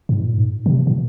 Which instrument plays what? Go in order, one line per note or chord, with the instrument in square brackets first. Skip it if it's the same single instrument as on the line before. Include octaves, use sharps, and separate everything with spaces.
[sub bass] G#2
A#2
G#2
C#3
C3
A#2